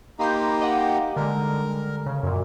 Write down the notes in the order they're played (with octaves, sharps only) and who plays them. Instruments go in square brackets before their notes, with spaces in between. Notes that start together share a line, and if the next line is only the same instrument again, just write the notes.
[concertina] A#3 D#4 G4 [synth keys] B5 C6 G6
[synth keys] D#5 F#5 G5
[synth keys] D3 G3 G#3 [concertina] A#4
[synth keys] C#3
F#2 A#2